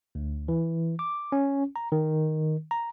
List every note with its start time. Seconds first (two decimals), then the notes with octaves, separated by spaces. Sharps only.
0.15 D2
0.48 E3
0.99 D6
1.32 C#4
1.76 A#5
1.92 D#3
2.71 A#5